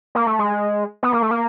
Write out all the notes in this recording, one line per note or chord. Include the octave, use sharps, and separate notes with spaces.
A#3
A3
G#3
B3
A#3
A3
A#3